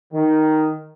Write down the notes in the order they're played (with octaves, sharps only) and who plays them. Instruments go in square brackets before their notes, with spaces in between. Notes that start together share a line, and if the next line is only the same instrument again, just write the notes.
[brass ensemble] D#3